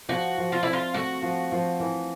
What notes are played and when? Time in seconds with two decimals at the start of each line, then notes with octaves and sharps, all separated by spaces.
0.09 F3 F#4
0.38 F3
0.52 F4
0.63 C4 E4
0.73 F4
0.94 A3 F#4
1.22 F3
1.52 F3
1.80 E3